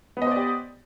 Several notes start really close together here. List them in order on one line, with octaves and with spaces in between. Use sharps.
B3 D#5 C5 D5 G4